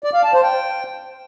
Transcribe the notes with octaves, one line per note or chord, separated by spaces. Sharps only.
D5
F5
A5
C5
G5